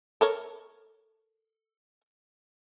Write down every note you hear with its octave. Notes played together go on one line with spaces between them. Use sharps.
A4 A#4 C#5